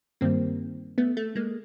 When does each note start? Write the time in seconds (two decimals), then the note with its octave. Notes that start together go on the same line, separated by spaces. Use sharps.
0.21 G2 D#3 G3 A#3 C4
0.98 A3 B3
1.17 A3
1.36 G#3 A#3